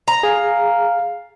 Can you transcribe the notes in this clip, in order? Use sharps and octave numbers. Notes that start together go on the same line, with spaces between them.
A#5
G#4 F5